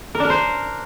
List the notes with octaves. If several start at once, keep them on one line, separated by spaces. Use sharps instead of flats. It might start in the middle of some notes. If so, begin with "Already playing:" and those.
A#4
D4
A#4
C5